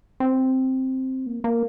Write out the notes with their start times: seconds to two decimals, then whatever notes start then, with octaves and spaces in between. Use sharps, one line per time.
0.20 C4
1.26 A#3
1.44 A#3